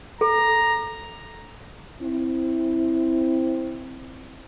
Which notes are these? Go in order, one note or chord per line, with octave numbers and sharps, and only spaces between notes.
A4 A#5
C4 E4